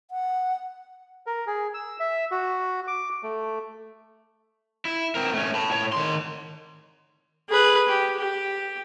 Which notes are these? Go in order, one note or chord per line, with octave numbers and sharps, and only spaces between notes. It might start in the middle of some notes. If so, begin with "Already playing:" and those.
F#5
A#4
G#4
E6
E5
F#4
D6
A3
E4
C4 A#4
A3 C#4
A5 B5
A2 C#5
D#3 C6
G#4 B4
G4
G4